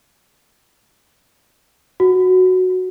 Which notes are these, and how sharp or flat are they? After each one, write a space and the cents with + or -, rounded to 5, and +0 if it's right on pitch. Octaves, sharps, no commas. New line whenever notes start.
F#4 -5